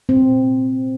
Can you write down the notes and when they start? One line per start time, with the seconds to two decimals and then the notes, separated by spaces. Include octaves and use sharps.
0.09 A#2 C4
0.28 A#2